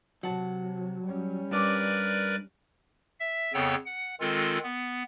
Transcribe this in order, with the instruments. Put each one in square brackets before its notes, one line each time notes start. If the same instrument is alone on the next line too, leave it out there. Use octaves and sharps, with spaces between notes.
[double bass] C3 [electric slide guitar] F#3 [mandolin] F#5 A5
[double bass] G3 C#4
[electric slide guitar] G2 [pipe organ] A#4 B4 D5 [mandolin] A5 D6
[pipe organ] E5
F2 C#3 B3 A4 C#5 G5
F#5
D#3 G#3 C4 F4 A4
B3